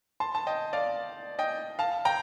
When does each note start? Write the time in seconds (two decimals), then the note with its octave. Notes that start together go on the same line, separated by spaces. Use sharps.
0.20 A5 C6
0.35 A5
0.47 D#5 G5
0.73 D5 F5
1.39 D#5 G5
1.79 F5 A5
2.05 G5 A#5